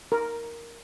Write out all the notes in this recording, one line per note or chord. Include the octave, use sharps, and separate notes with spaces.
A#4